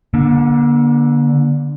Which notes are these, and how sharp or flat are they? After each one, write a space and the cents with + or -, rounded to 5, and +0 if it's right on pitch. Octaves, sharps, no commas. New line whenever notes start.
D3 +0 A#3 +40